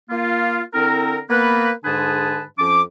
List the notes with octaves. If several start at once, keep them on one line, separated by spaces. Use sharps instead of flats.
A#3 F4
D3 C4 E4 A#4
A#3 B3 B4
G#2 D3 D4 G#4 B4 A5
F2 F3 C#4 D6